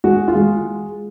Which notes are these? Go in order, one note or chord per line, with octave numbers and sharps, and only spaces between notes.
G#3 F#4
F4
G#3